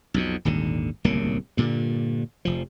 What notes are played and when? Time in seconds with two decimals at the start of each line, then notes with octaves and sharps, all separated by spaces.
0.14 B1 F2 B2
0.45 D#1 G#1 D#2 D3
1.04 D1 C2 C#3 A#3
1.57 G2 A#2 D3
2.45 F1 F3